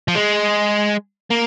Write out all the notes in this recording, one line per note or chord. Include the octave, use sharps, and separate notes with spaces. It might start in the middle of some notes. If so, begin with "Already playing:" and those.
F3
G#3
A#3